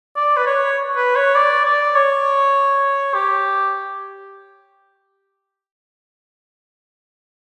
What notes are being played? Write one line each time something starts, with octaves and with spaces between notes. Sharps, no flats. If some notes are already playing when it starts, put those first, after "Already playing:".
D5
B4
C#5
B4
C#5
D5
D5
C#5
G4